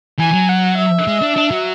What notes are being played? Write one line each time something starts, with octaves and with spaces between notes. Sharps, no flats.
E3 G#5
F#3
F#5
E5
G#3
D4
D4
F#3